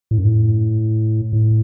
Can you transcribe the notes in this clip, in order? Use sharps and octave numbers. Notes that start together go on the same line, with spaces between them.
A2
F#2
A2
A2